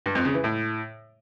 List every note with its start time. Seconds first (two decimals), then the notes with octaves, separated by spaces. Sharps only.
0.06 G2
0.15 F2
0.25 C#3
0.34 E3
0.44 A2